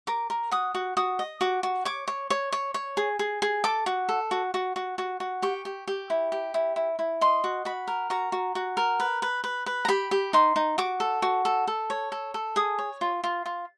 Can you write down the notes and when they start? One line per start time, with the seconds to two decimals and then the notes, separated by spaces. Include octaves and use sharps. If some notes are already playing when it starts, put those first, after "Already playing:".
0.07 A#4 D6
0.30 A#4
0.51 F#4 D#6
0.75 F#4
0.97 F#4 D#6
1.19 D#5
1.41 F#4 D6
1.63 F#4
1.85 C#5 D6
2.08 C#5
2.30 C#5
2.52 C#5
2.74 C#5
2.97 G#4
3.19 G#4
3.42 G#4
3.64 A4 D6
3.86 F#4
4.09 A4
4.31 F#4
4.54 F#4
4.76 F#4
4.98 F#4
5.20 F#4
5.42 G4 C#6
5.65 G4
5.88 G4
6.10 E4
6.32 G4
6.54 E4
6.76 E4
6.99 E4
7.21 D#5 C6
7.44 F#4
7.65 F#4 B5
7.88 A#4
8.10 F#4 A#5
8.32 F#4
8.55 F#4
8.77 A#4
9.00 B4
9.22 B4
9.44 B4
9.66 B4
9.85 A#5
9.88 G4 B5
10.11 G4
10.33 D#4 C6
10.56 D#4
10.78 F#4 D6
11.00 A4
11.22 F#4
11.45 A4
11.67 A4
11.90 C#5
12.12 A4
12.34 A4
12.56 G#4 D#6
12.79 C#5
13.01 F4
13.24 F4
13.46 F4